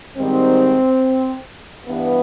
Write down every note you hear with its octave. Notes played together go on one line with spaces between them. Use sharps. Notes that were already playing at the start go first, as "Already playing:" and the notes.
G#2 D#3 G3 C4
G2 E3 G3 B3